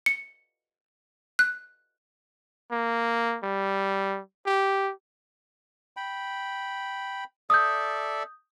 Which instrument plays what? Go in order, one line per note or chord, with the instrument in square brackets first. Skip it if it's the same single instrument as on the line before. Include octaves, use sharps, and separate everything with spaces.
[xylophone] C#7
F#6
[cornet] A#3
G3
G4
[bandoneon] G5 B5
[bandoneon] A4 D5 E5 [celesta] D#6 G6